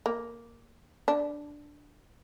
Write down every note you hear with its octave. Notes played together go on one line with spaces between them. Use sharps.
A#3
D4